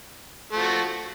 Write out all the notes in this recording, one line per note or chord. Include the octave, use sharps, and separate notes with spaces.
F3 A3 F#4